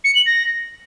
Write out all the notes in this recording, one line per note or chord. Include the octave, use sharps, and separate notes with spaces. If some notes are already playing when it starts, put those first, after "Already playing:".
C#7
F#7
A#6